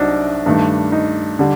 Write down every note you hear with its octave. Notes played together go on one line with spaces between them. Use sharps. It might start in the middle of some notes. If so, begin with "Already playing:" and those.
Already playing: C2 C3 F#3 D4 D#4 F#4
G2 D#3 A3
D#4
D3 G3